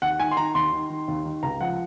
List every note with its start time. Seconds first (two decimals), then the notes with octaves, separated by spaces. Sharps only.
0.02 D#2 F#5
0.20 D#3 G#5
0.31 C6
0.37 D#3 A#5
0.55 D#2 C6
0.72 D#3
0.90 D#3
1.08 D#2
1.25 D#3
1.43 C#2 A#5
1.60 F3 F#5